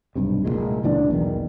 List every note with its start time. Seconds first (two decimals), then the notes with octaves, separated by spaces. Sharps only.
0.15 B1 G2 C3
0.45 F1 D#2 A#2 G#3
0.83 C#2 A#2 E3 D4
1.10 B1 E2 D#3